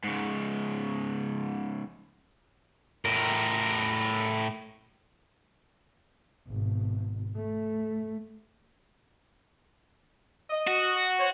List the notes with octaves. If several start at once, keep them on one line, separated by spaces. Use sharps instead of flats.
G#2 C#3
A2 A#4
G#1 B2
A3
D#5
F#4
C5 C#5